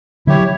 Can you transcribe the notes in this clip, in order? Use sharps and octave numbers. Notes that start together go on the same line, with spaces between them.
D3 F#3 E4 G4 C#5